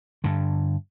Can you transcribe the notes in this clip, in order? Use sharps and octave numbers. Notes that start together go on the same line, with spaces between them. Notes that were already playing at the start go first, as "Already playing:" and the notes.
G2 D3